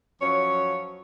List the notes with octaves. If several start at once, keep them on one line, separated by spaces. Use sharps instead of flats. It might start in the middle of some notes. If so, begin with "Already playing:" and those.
F#2 F3 C#5